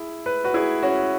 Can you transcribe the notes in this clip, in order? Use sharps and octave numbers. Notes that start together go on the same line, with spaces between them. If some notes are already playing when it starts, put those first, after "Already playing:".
Already playing: E4 G#4
B4
F#4 B4
E4 G#4
C#4 F#4